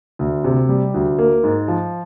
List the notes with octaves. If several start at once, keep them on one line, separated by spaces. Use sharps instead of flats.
D2
C3
G3
D2
A#3
G#2
F3